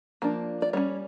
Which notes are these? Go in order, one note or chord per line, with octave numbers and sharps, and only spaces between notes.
F3 A#3 D4
D5
G3 A#3 C#4 C#5